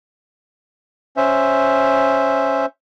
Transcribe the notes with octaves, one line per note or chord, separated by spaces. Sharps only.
C#4 C5 E5